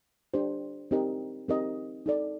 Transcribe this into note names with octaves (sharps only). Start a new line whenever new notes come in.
D4 G4 C5
C4 D#4 G4 A#4 D#5
C4 D#4 G4 A#4 D#5
D#4 A4 D5